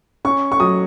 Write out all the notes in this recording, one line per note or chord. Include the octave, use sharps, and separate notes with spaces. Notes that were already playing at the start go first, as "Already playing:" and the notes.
C#4 C#6
C#6
F#3 D#6